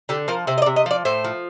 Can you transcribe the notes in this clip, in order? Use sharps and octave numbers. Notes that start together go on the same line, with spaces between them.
D3 G4
F3 A#4
C3 C5
D#5
D5
C3
D#5
F3 D5
A2 C5
F3